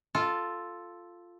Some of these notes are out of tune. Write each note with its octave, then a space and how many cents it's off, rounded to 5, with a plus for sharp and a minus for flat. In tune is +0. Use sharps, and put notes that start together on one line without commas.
F4 +0 A4 +0